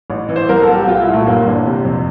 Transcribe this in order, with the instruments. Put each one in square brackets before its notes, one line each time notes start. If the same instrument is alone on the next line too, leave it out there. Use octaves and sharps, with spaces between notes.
[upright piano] A1
E3
C5
C2 A#4
A4
C2
G4
C2 F4
E4
A#2
A3
G1 A#3
E3 D4
C3
F2